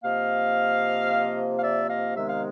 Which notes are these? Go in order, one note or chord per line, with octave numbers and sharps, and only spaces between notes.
C3 F3 A#3 D#5 F5
F5
D5 E5
D#5 F5
C3 D#3 G#3 B3 E5
F5